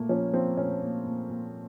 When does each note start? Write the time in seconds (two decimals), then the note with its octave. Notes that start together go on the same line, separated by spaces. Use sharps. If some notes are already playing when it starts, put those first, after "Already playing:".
Already playing: A#2 A3 A#3
0.09 F3 C#4
0.33 F3 C4
0.57 A#2 C#4
0.82 A#2
1.06 A#2
1.30 A#2